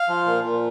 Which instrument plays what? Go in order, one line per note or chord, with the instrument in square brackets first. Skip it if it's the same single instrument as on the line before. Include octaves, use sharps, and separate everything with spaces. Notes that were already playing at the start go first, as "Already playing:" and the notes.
Already playing: [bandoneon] F5
F3
A#2
A#2